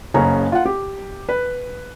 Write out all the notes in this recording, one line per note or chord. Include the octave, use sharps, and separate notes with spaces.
F#1 C#3 C#4 C#5 A#5
F4 F#5
G4
B4